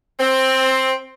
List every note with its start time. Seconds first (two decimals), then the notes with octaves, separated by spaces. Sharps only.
0.20 C4